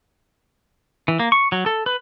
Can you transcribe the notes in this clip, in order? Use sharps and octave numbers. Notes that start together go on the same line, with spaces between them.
E3
A#3
C#6
F#3
A4
B4